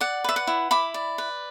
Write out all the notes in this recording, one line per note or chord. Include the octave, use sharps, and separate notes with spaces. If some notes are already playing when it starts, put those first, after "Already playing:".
D5 F#5
B4 E5
F#5
E4
E4 B5 D6
D5
B4